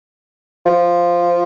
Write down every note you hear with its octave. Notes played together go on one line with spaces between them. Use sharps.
F3